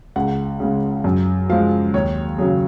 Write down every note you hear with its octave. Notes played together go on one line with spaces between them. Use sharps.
C#2 F#5
C#3 G#3
F#2
F3 G#3 F5
D#2 C#5
C#3 F#3 G#4